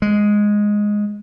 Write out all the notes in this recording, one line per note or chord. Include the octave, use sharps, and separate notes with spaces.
G#3